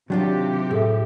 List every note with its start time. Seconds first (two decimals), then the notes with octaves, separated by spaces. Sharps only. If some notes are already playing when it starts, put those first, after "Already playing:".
0.10 C3 D#3 F#3 D4 F4 G4
0.71 A2 G#4 A4 E5